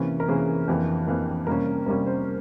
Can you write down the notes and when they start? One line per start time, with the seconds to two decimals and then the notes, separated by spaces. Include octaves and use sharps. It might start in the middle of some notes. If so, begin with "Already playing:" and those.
Already playing: C3 E3 A#3 C#4
0.20 A#4
0.28 C3 E3 A#3 C#4 G#4
0.68 F2 E3 A#3 G4
1.07 F2 E3 A#3
1.47 C3 G3 A#3 C#4 A#4
1.86 C3 G3 A#3 C#4 A#4
2.07 C5